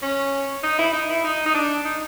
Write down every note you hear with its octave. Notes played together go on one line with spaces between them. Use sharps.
C#4
D#4
E4
D#4
E4
D#4
D#4
D4
D#4